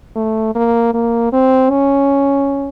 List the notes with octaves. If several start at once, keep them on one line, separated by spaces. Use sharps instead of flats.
A3
A#3
A#3
C4
C#4